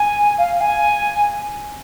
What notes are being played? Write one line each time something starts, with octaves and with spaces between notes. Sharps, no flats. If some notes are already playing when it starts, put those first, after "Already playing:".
Already playing: G#5
F5
G#5